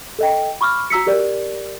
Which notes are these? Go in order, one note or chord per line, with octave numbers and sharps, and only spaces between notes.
A4 D#5 G5
B5 C#6 D6 F6
F#4 A#5 E6 B6 C#7
G4 A#4 D5